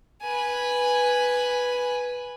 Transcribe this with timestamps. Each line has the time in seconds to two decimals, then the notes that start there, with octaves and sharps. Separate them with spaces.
0.23 B4 G#5